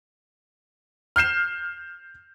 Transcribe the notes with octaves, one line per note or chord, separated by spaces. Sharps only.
F6 G6 C7 E7